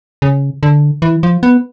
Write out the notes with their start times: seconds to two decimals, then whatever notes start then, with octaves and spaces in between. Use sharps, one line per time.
0.22 C#3
0.63 D3
1.02 E3
1.23 F3
1.43 B3